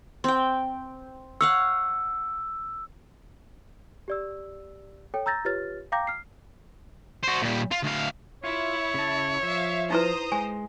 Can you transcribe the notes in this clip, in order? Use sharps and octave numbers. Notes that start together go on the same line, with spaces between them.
C4 G5
C#5 F5 F#5 E6
G4 D5 E6
A4 C#5 G5
A#5 E6 G6 A6 A#6
F4 G4 B4 C#5 F6 A6
F5 G5 A#5 D6 G6 A#6
F6 C7
F#4 C5
A#2 G3
F4
D2 F5
E4 F4 C#5
C#3 A5
F3 E5 F5
D#4 E4 B4 C5 A#5 D#6
G#3 G#5